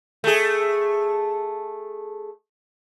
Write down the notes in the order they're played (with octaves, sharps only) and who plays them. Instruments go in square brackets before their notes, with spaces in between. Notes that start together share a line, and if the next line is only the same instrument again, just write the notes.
[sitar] A3 G#4